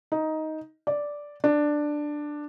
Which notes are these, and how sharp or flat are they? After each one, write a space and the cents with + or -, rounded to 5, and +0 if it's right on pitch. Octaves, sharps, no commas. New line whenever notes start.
D#4 +10
D5 -5
D4 +10